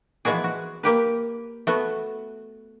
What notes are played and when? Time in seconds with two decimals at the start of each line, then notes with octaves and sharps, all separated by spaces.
0.25 E3 F3 G#3 B3 F#4 G#4
0.44 F#4
0.83 A#3 G4 B4
1.67 A3 B3 F#4